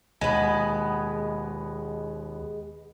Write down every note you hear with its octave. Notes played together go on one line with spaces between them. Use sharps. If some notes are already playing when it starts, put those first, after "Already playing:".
D#2 B2 G#3 B3